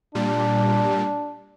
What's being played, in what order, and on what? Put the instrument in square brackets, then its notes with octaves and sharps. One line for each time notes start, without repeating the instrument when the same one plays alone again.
[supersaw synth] A#2 G3 [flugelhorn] D4